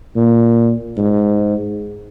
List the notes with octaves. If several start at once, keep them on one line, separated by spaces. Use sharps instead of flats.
A#2
G#2